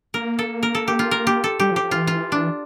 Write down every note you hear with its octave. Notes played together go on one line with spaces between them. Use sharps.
A#3 A#4
A4
A#4
A4
G4
F4
A#4
G4
A4
G3 G4
F3
G4
F3
E3 F4
F4
D4